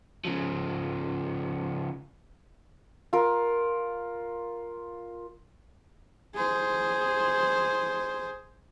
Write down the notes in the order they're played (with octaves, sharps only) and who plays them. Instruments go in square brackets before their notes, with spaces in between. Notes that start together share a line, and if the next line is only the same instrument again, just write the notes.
[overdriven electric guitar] C#3 F3
[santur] F4 A#4
[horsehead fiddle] G#4 C5